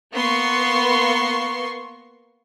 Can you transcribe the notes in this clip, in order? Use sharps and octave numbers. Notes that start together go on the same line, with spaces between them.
A#3 B3 C6 C#6